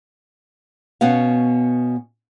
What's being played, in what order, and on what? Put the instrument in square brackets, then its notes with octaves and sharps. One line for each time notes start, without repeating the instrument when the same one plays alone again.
[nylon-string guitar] B2 B3 C#4 F5